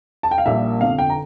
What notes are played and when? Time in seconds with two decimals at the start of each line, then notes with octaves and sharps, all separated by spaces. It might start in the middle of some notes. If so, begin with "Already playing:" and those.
0.23 A5
0.31 G5
0.38 F5
0.46 A#1 A#2 G3 A#3 E5
0.81 G1 F2 D3 F5
0.98 G5
1.10 A#5